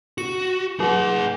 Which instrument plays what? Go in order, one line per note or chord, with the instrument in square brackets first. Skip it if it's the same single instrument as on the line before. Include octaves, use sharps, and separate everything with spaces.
[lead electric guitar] F#4 [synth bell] C#7
[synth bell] F#3 [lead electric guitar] G#4 F#5